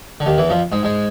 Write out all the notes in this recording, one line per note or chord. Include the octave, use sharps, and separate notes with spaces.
D3
D#2 D#3
E2 E3
F2 F3
G#2 G#3
G#2 G#3